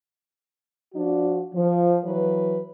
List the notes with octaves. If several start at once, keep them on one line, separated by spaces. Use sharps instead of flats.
F3 D4 F#4
F3
E3 F#3 B4